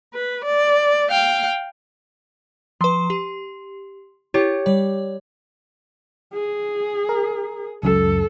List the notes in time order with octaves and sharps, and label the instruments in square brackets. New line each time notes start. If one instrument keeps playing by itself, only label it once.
[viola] B4
D5
F5 G5
[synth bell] F3 B4 [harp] C6
[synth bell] G4
[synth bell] E4 [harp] G4 C#5
[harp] G3 [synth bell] C#5
[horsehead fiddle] G#4
[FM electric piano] A#4
[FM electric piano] C#2 F#2 [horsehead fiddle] A4